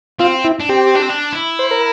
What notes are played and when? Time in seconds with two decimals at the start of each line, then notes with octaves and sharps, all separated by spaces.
0.19 C4 F4
0.44 E4
0.60 D4
0.69 C4 G4
0.95 D4
1.02 C4
1.09 D4
1.33 E4
1.59 C5
1.71 A#4